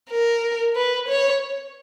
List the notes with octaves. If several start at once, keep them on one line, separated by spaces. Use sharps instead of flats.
A#4
B4
C#5